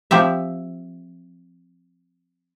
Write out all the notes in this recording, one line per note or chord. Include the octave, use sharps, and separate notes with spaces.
F3 C4 G4 E5